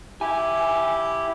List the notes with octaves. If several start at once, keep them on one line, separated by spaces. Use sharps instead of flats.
E4 G4 G#5